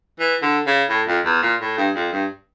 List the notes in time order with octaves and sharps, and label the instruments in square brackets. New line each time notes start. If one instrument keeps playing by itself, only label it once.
[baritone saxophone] E3
D3
C#3
A2
F2
E2
A#2
A2
G2
F2
G2